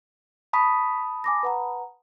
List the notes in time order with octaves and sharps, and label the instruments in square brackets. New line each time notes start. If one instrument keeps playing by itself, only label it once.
[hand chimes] A5 B5 D#6 [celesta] C#6 B6
[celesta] G#5 D6 A#6
B4 F#5 A#5